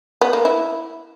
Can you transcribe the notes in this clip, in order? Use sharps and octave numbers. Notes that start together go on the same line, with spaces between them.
B3
A#3
E4